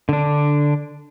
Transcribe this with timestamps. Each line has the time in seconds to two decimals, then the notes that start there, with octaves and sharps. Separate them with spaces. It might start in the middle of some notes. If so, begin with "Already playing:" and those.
0.09 D3 D4